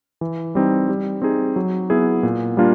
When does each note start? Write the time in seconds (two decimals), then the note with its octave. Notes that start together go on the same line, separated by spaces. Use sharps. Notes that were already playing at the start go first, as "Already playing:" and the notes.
0.21 E3
0.55 G3 C4 D#4
0.89 G3
1.22 C4 D#4 G#4
1.56 F#3
1.90 B3 E4 G#4
2.23 A#2
2.57 G3 A#3 D4 F4